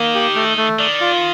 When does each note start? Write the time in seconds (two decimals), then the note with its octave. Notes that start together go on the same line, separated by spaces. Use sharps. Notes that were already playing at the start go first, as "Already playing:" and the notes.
Already playing: D#3 A#3
0.15 G4
0.35 A3
0.57 A3
0.79 D#3 D5
1.01 F4